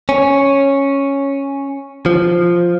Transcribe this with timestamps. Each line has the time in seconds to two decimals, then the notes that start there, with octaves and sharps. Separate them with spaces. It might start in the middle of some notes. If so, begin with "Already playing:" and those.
0.09 C#4
2.06 F3